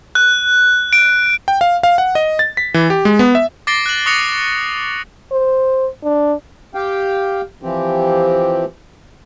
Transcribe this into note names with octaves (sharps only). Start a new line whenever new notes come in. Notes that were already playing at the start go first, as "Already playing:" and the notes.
F#6
D7
G5
F5
F5
F#5
D#5
A6
B6
E3
G4
G#3
B3
E5
D6 A6 A#6 C7 D7 G7
F#6 F#7
C#6 D#6 F#6 A#6 C#7 F7
C5
D4
G4 F5 G5
E3 F3 C4 G4